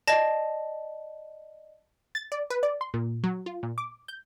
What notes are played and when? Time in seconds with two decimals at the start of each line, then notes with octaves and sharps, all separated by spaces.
0.08 D5 D#5 A5 A#6
2.15 A6
2.32 D5
2.50 B4
2.63 D5
2.81 C6
2.94 A#2
3.24 F#3
3.46 F4
3.63 A#2
3.78 D6
4.08 G6